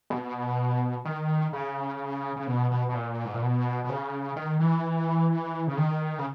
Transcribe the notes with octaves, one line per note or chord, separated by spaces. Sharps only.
B2
D#3
C#3
C#3
B2
B2
B2
A#2
G#2
A#2
B2
B2
C#3
D#3
E3
C#3
D#3
C#3